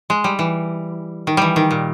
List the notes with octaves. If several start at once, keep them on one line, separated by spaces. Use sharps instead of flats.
G#3
G3
E3
D#3
E3 G3
D#3
A#2